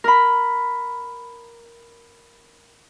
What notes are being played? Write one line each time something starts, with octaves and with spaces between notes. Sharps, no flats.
A#4 B5